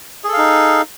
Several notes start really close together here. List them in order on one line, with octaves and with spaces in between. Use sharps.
G#4 A4 F5 D#4